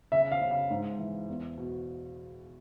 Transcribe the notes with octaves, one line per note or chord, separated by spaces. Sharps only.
C#3 E5
F5
C#3
F5
G#2
E3
E2
B2